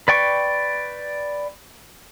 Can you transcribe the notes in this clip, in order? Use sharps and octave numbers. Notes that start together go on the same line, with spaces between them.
B4 D5 G5 C#6